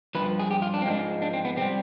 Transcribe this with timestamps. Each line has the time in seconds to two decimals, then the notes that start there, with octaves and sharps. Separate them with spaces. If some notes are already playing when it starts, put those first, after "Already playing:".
0.15 G2 F3 B4
0.39 G#4
0.51 G4
0.62 F4
0.74 D4
0.82 C4
0.86 G#2 F3 G#3 D4
1.22 D4
1.33 C4
1.45 B3
1.56 C3 G3 C4